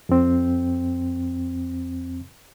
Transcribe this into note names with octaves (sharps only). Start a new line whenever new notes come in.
F2 C4